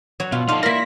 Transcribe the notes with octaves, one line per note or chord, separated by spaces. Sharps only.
F#3 C#5
B2 F4
D#4 A4 D5 F5 C6
A#3 E4 A#4 A#6 B6